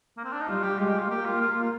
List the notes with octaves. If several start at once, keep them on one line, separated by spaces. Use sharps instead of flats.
A#3
C4
D4
D#4
G3 F4
G4
G#3 F4
G4
F4
A#3 G4
F4
F4
F4
F4